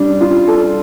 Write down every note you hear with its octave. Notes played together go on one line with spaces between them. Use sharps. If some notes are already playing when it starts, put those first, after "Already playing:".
Already playing: G3 D4
F4
A4